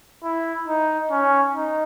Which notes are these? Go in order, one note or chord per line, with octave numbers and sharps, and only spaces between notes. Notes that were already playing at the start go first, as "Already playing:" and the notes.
E4
D#4
C#4
D#4